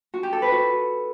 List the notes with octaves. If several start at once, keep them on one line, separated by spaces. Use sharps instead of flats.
F#4
G4
A4
B4
F#4